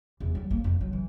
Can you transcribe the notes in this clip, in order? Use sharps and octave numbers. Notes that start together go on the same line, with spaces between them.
E2
G3
A#3
F2
F#3
E3